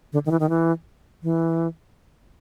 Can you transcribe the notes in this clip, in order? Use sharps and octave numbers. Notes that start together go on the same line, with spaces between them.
D3
D#3
E3
D#3
E3
E3